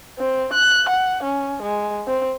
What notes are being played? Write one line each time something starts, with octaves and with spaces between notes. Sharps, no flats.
C4
F#6
F#5
C#4
G#3
C4